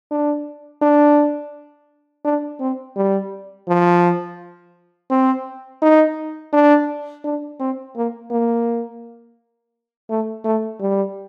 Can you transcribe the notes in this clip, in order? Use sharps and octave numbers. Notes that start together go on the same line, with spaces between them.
D4
D4
D4
C4
G3
F3
C4
D#4
D4
D4
C4
A#3
A#3
A3
A3
G3